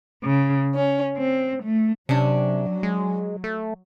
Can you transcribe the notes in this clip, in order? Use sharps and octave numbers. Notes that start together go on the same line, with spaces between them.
C#3
C#4
C4
A3
C3 F#3 C#4 D4
G#3
A3